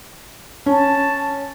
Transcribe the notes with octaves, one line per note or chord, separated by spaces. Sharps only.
C#4 A5